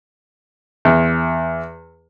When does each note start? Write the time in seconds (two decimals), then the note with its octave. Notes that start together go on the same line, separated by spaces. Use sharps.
0.85 E2